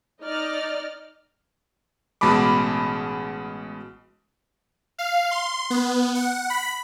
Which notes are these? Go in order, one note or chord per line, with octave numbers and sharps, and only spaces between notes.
D#4 D5 D#5 F6
A1 B2 G#3 A5 B5 D6
F5
C6
B3
F#5
B5